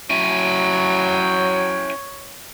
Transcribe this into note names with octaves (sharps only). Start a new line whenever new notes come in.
F#3 C#4 E4 C#5 G5 G#5